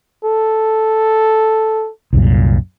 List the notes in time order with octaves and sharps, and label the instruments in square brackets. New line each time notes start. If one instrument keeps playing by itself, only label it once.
[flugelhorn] A4
[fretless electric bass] C2 F#2 A#2